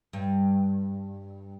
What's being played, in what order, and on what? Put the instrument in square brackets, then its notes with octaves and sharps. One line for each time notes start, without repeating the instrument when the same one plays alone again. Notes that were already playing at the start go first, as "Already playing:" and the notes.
[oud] G2